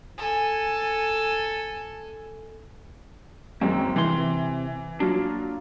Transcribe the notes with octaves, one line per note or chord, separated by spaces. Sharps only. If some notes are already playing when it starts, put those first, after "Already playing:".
A4 G#5
F#2 D#3 G#3 A#3 C4
C3 E3 C6
F#3 A#3 D4 F4